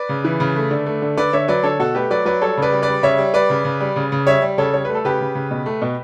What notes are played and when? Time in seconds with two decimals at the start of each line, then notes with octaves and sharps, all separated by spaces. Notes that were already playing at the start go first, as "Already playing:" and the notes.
Already playing: B4 D5
0.09 C#3
0.25 E3
0.40 C#3
0.56 A3
0.71 D3
0.86 A3
1.02 D3
1.17 D3 B4 D5
1.33 D3 C#5 E5
1.48 F#3 B4 D5
1.63 D3 A4 C#5
1.79 B2 F#4 A4
1.94 A3 G4 B4
2.11 F#3 B4 D5
2.25 F#3 B4 D5
2.42 G3 A4 C#5
2.58 C#3 B4 D5
2.72 G3
2.82 B4 D5
2.88 G3
3.03 C#3 C#5 E5
3.18 G3
3.34 G3 B4 D5
3.50 C#3
3.65 C#3
3.81 G3
3.96 C#3
4.12 C#3
4.27 G3 C#5 E5
4.42 G3
4.58 C#3 A4 C#5
4.74 G3 C#5
4.85 A3 B4
4.95 A4
5.04 C#3 G4 B4
5.21 C#3
5.35 C#3
5.51 B2
5.66 A3
5.82 B2